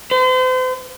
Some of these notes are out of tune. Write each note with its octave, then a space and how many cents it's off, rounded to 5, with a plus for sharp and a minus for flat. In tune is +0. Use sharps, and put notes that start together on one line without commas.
C5 -40